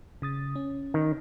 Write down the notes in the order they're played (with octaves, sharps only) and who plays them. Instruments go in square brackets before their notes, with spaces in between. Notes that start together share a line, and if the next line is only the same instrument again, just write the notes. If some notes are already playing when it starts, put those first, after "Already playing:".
[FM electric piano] C#3 D#6 A6
C#4
[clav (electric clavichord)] D#3